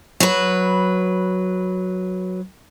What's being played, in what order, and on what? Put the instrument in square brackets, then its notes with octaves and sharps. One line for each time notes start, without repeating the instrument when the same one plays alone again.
[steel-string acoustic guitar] F#3 B4